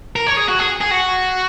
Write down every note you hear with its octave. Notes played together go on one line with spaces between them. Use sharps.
A#4
C#5
G#4
F#4
G#4
G#4
F#4